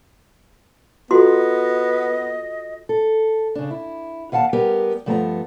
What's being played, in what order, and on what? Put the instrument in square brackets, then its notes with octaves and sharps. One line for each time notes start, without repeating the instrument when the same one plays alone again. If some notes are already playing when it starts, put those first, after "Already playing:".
[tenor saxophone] B3 [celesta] F4 A4 [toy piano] F#4 C6 [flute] D#5
[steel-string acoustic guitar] A4
C#3 D4
E4
D#2 F5 F#5 G#5 A5
G3 B3 G4 A#4
G2 F3 A3 B3 C5 A#5